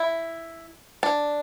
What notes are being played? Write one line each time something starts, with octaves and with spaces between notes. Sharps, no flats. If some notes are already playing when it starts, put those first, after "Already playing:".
Already playing: E4
D4